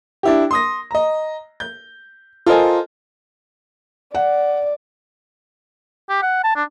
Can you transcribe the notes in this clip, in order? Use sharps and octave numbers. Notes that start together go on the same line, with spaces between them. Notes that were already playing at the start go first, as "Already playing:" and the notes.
D4 E4 G4
C6 D#6 A#6
D#5 A#5
G6
F4 A4 A#4 C5 D#5 G#5
D5 F#5
G4
F#5
A5
D4